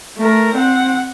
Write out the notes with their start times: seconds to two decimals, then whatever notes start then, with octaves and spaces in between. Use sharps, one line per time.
0.18 A3 A#4
0.54 C4 F#5